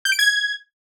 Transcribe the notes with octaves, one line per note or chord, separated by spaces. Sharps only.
G6
D7
G#6